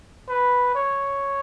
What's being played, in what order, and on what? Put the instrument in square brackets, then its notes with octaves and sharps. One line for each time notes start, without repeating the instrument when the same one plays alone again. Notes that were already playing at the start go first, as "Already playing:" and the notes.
[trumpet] B4
C#5